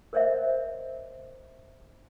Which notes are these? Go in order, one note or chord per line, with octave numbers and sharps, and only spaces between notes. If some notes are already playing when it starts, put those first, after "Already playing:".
A#4 C5 C#5 D#5 E5